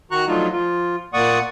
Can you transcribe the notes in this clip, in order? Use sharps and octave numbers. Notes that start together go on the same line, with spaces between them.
D#3 F#4 A#5 C#6 F#6
F3 F#3 A3 D4 D#4 F4
F3 F4
A#2 A#3 D5 F#5 C#6 D#6